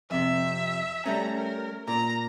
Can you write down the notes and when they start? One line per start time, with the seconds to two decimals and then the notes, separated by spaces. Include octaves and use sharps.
0.11 F2 C3 E5
1.06 G3 A3 C#4 A#5
1.37 A#4
1.88 A#2 A#5